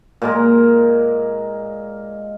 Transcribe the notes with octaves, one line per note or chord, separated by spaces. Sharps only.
A#2 G#3 A#4